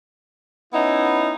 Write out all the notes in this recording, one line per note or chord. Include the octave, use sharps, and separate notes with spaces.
B3 C#4 D#4 E4